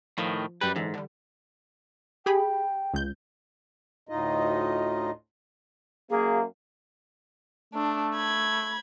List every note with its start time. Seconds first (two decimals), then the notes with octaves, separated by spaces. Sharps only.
0.18 A2 D#3 F3
0.61 F#2 G3 G4 B4
0.76 G#2 D3 E3
0.94 D3 G3
2.26 G4 G#4 G5 B5
2.94 C#2 G6
4.09 D2 A2 D#4 F4 D#5
6.10 F#2 A#3 G#4
7.74 A3 D4
8.16 B5 G#6